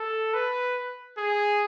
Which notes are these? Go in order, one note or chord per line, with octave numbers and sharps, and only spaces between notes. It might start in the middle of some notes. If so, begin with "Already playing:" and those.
Already playing: A4
B4
G#4